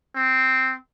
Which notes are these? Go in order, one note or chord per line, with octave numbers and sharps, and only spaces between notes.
C4